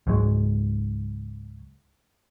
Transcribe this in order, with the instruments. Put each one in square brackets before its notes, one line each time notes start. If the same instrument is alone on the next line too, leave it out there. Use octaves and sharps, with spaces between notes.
[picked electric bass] C#2 G#2 F#3 G#3